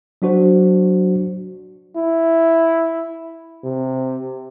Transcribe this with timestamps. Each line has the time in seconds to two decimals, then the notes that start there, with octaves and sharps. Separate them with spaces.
0.22 F#3 D4 F#4 C5
1.97 E4
3.64 C3